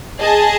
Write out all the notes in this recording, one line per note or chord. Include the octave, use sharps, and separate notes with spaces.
G#4 D#5 A5